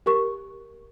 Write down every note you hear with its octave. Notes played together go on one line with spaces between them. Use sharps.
G4 A#4 C#6